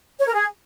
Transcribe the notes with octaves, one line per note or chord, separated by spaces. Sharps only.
C#5
A#4
G#4